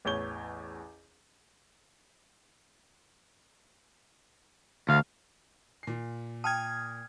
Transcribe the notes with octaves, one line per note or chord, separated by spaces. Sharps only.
A1 E2 C#5 G6 G7
D2 F5
A#2 C7
G5 A5 D#6 F6 G#6